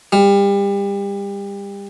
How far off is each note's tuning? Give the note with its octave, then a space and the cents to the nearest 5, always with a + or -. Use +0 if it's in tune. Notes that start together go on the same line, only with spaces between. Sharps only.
G3 +30